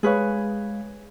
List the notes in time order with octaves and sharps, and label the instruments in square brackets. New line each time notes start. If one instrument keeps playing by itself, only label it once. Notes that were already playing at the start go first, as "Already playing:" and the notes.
[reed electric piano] G#3 F5 [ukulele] G#4 B4 C#5